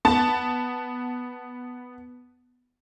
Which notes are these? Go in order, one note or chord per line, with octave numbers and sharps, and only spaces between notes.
B3 A5